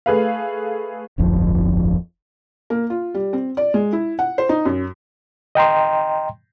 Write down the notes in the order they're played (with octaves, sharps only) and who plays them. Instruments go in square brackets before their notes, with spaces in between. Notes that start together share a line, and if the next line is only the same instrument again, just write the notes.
[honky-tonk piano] A3 G#4 B4 F5
[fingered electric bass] D1 G1 F2 F3
[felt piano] A#3
F4
G3
C4
D5
G#3
E4
F#5
C5
D#4
F#2
[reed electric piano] D#5 G5 A#5 C6